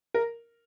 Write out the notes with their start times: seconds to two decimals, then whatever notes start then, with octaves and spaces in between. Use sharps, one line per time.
0.14 A#4